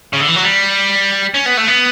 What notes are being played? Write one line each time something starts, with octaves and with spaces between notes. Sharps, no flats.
C#3
D3
E3
F#3
G3
C#4
B3
A3
B3